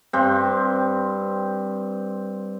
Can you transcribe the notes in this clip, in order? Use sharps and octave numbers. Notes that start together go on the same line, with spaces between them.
G2 C4